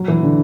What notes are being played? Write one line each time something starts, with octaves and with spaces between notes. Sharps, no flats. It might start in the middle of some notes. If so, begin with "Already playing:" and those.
Already playing: F#3
E3
D3